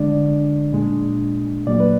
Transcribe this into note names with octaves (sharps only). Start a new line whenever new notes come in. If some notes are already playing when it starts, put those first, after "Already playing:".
Already playing: D3 G#3 D4 D5
A#2 G#3 D4
A#2 F#3 A#3 D5
B4